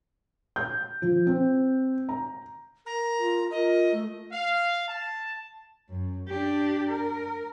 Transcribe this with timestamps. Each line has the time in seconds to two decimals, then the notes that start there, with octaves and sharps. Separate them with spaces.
0.56 G6
1.02 F3
1.27 C4
2.09 A#5
2.86 A#4 A#5
3.19 F4
3.51 F4 A#4 D#5
3.92 A3
4.32 F5
4.88 A5
5.89 F#2
6.28 D4 G4
6.90 A#4